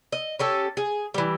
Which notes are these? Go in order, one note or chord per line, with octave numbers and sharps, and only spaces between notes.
D#5
C#4 G4 A4
G#4
E3 G3